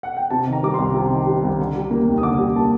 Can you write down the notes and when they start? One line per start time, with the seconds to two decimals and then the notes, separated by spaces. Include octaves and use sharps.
0.03 F#5
0.17 G5
0.30 C3 A5
0.47 D#3
0.53 A#5
0.63 G3 D6
0.74 C2 C6
0.95 C3
1.11 D#3
1.27 G3
1.43 C2
1.59 D3
1.76 G3
1.91 A#3
2.08 D#2
2.18 D#6
2.23 D3 D6
2.39 G3
2.56 A#3 A5